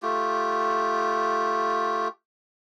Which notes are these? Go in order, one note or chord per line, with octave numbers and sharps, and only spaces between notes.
A3 F4 G4